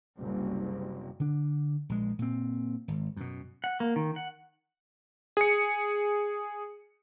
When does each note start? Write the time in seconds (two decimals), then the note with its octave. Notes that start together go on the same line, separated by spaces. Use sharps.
0.19 F#1 C2
1.20 D3 D4
1.89 A#1 G#3
2.19 A#2 C4
2.88 G#1
3.17 F#2 B2
3.64 F#5
3.80 A#3
3.96 D#3
4.16 F#5
5.37 G#4 C#7